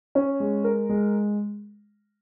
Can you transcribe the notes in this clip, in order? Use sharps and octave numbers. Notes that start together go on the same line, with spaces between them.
C#4
G#3
A#4
G#3